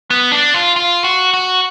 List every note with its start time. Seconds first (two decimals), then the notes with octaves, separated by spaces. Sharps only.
0.10 B3
0.32 D4
0.54 F4
0.76 F4
1.04 F#4
1.34 F#4